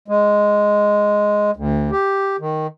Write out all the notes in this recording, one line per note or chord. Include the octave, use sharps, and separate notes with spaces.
G#3
D2
G4
D#3